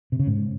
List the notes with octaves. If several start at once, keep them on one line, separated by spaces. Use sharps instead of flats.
C3
C#3
G#2